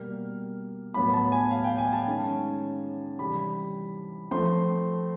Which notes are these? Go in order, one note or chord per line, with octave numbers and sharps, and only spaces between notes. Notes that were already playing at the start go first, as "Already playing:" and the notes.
Already playing: B2 G3 A#3 F6
A2 F#3 B3 B5
A5
G#5
F5
G5
G#5
A5
D#3 G#3 C#4
C3 E3 G3 B5
F3 A3 C4 C6